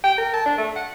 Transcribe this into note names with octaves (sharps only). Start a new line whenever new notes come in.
G5
A#4
A5
D4
A3
F#5